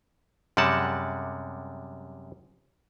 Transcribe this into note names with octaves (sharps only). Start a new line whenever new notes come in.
F#2 C3 G3 G#3 F#5 A5